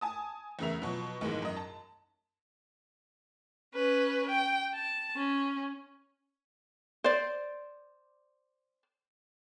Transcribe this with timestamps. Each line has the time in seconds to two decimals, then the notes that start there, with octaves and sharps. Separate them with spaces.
0.01 G#5 A5 D#6
0.59 E2 A2 C#3 A#4 E5 F7
0.82 B2 F3 F#3
1.21 B1 G#2 D#3 E3 G#3
1.42 F#2 D#5
1.57 A5
3.74 C#4 B4
4.29 G5
4.75 A5
5.17 C#4
7.04 C5 D5